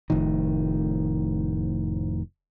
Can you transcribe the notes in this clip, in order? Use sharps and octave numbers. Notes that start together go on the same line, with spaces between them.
F1 F2 A2 D#3